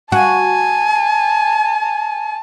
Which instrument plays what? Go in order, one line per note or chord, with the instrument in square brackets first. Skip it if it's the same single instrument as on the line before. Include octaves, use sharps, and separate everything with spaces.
[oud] F#4 [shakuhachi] G#5 [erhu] A5